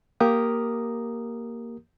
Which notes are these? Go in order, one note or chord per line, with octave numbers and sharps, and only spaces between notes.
A#3 G4 A#4 A#5 D#6